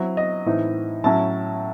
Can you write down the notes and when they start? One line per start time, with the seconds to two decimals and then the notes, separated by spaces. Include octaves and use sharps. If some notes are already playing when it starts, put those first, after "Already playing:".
Already playing: F#3 C4 E4
0.17 D#5
0.46 A2 E3 C4 D#4
1.04 A2 F#3 C#4 E4 A5